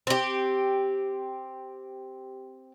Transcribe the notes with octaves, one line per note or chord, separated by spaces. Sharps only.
C4 G4